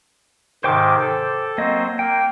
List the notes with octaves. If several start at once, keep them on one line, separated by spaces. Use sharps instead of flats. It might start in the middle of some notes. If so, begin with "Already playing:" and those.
G#2 C3 D#3 C5 G5 D6
A4
F#3 A#3 C4 D#5
A#3 G5